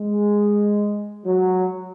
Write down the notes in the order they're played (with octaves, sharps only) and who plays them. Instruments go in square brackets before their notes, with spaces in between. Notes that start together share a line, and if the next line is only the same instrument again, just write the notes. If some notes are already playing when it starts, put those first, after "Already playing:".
Already playing: [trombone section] G#3
F#3